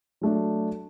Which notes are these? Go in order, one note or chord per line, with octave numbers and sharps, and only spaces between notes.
F#3 A3 D4